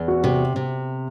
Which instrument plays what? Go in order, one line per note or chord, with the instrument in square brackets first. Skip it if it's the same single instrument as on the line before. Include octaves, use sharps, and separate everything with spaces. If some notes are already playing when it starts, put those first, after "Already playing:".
Already playing: [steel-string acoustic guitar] E2
[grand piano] F#4
[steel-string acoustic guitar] C3
C3